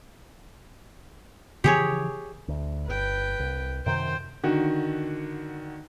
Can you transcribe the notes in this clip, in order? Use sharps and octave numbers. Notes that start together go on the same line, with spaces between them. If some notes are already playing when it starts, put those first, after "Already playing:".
C#3 E3 F3 G4 G#4 C#5
D2
G1 B4 G5
C2
F#2 C3 D#3 C5 G5
D3 D#3 F#4